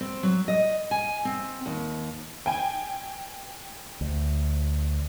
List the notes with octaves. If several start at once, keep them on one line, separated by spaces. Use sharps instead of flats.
C4
F#3
D#5
G#5
C4
D#2
G5 G#5
D2